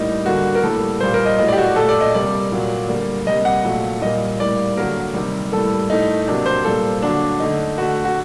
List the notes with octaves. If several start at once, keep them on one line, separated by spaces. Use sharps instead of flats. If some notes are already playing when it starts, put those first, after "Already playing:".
Already playing: A2 G3 A#3 D#4
D3 G3 A#3 F#4
A#4
A2 G3 A#3 A4
A#2 G3 A#3 C5
A#4
D#5
A2 F#3 A3 D#5
D5
G4
F#4
A#2 A3 A4
D5
D#5
C3 G3 A#3 D5
A#2 F#3 A#3
D3 G3 A#3
C3 G3 A#3 D#5
F#5
A#2 F#3 A3
A#2 G3 A#3 D#5
A2 G3 A#3 D5
D3 F#3 A#3 A#4
C3 D#3 G3
A2 G3 A#3 A4
A2 A3 D#4
C3 F#3 A#3 D4
C5
A#2 G3 A#3 A4
D3 F#3 A#3 D4
D3 A3 D#4
D3 A3 F#4
F#4